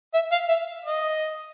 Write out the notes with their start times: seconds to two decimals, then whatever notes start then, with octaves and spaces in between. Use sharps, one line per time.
0.14 E5
0.31 F5
0.49 E5
0.85 D#5